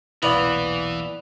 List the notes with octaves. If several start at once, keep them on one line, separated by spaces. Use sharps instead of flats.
B1 E2 A#2 E3 B3 E4 D5 F5